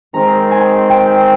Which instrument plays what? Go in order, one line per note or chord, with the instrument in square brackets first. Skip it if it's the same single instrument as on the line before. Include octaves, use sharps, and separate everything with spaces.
[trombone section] D#3 G#3 C4 [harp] A#5
[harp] G#5
G5